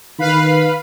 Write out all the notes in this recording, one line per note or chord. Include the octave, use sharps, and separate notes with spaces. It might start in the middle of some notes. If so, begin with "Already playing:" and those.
D#3 B4 F5 B5